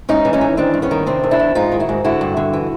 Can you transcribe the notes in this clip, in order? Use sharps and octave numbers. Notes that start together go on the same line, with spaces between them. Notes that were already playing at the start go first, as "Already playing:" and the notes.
G#2 C#4 D#4
E3
C#4 D#4
E3
D#3 C4 D4
G2
B3 C#4
D#3
C3 C4 D4
E2
D4 E4
E2
G#2 D#4 F4
D#3
E4 F#4
G#2
D3 E4 F#4
G2
D3
E3